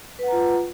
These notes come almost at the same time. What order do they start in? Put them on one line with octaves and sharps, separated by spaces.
B4 F#5 A#5 F4